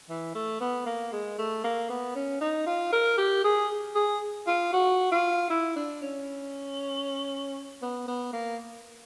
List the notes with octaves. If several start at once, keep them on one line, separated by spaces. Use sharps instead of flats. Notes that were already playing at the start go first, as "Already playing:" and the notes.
E3
A3
B3
A#3
G#3
A3
A#3
B3
C#4
D#4
F4
A#4
G4
G#4
G#4
F4
F#4
F4
E4
D4
C#4
B3
B3
A#3